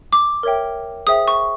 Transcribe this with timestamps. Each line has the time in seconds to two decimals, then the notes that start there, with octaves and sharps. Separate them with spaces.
0.13 D6
0.43 A#4 C#5 E5 G5
1.07 G#4 C5 E5 G5 D#6
1.28 C#6